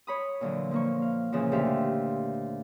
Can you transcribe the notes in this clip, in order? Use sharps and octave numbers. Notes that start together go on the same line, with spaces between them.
C#5 B5 D#6
A#2 D3 E3 F#3
F3 A#3 C#6
F5
A#2 C#3 E3 F3
D2 G4 C5 E5 F5